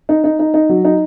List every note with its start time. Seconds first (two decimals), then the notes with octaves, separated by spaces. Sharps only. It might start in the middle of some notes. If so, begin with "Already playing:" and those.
0.09 D#4
0.24 D#4
0.39 D#4
0.54 D#4
0.69 F#3
0.85 D#4